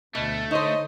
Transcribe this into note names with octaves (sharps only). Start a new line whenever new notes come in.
D2 B2 A3
D3 D#4 C5 C#5 D#5